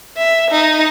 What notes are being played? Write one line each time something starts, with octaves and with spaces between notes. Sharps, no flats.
E5
D#4